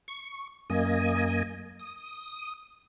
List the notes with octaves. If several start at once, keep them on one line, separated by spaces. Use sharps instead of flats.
C#6
F#2 A#3 D#5 G#5
D#6